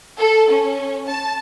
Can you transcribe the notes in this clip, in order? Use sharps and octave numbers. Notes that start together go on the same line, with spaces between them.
A4
C#4
A5